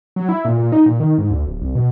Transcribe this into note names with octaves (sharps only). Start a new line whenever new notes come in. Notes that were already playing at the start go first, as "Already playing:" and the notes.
F#3
E4
A#2
A#2
D#4
A#2
D#3
G#2
D2
D1
C2
B2